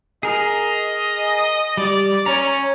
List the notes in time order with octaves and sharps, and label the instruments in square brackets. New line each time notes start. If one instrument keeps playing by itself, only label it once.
[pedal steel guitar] G#4 A#4 [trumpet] D#5
[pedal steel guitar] G3 [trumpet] D5
[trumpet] C#4 [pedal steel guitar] C#5 A#5